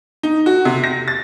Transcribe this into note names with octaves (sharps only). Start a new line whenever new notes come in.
D#4
F#4
C3
A#6
A6